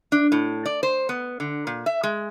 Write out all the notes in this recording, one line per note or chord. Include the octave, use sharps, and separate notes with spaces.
D4
A2
D5
C5
B3
D3
A#2
E5
G#3